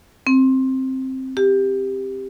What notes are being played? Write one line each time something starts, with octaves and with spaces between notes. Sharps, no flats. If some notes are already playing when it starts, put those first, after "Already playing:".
C4
G4